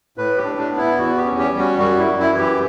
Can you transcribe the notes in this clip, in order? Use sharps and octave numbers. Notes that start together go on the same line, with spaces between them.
A2 B4
G4
D4
D4
B3
E4
E2 F#4
G4
C#4
G4
G3
F#4
F#2 F#4
E4
F#2
E4
E3
G4